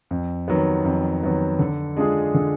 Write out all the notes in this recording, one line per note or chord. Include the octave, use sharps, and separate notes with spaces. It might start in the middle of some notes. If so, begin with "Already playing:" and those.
F2
D#3 F#3 B3
F2
D#3 F#3 B3
D3
G#3 D4 F4 G#4
D3